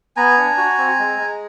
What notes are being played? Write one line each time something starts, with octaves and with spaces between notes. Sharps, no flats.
B3 G#5 A#5
D4
F#4
C4
G#3
G#3